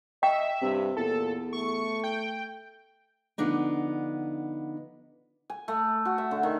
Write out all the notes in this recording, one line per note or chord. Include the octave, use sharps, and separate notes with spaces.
D#5 E5 G5
G2 C3
E2 A#2 A4
A3 C#6
G5
D3 F3 B3 D4 D#4
G#5
A3
F#4
E5
D3
D#3